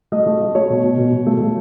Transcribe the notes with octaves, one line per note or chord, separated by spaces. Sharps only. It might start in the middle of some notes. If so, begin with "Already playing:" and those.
A3 D#5
A3
A3
A3 C#5
B2
B2
B2
B2
A3
A3